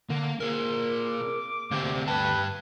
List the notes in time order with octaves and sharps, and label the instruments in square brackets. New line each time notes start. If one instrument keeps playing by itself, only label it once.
[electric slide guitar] D3 [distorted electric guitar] A#3
[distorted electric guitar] A#2 [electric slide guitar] G#4 A#4
[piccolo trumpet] D6
[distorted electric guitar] D2 [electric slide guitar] A#3 C4 G4
[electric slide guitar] G2 G4 A5 [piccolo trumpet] B4